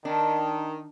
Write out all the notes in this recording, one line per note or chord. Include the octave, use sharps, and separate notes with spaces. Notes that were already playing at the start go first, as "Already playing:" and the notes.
D#3 D4